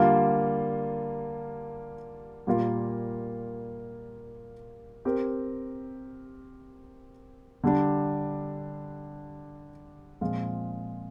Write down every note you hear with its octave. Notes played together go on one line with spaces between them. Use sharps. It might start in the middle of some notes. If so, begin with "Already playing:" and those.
Already playing: D3 G3 A#3 F4
A#2 G3 A#3 F4 A#4
C4 G4 A#4
D3 G3 D4
A#2 F3 G#3 C4 F4